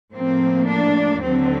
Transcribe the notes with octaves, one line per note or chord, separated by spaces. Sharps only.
A2 F3 A#3 C4
D4
D#2 D3 F#3 C4